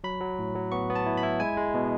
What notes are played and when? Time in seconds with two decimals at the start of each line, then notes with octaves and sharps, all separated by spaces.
0.04 F#3 B5
0.21 F#3
0.39 A2
0.55 F#3
0.72 B3 C#6
0.90 B3
0.95 A5
1.06 E4
1.17 B5
1.23 E4
1.40 G#3 G#5
1.57 G#3
1.74 B2